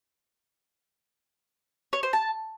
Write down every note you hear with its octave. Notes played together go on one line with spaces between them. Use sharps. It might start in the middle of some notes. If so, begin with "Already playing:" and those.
C#5
C5
A5